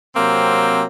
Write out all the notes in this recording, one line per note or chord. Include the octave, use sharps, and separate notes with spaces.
C3 F#3 A#3 C4